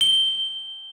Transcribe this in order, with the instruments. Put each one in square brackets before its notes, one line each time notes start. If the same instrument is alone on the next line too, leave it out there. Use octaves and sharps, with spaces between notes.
[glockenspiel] G7